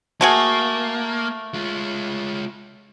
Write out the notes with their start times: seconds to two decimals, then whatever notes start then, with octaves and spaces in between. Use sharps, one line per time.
0.21 A3 A#3 F#4 G#4
1.54 G#3 F4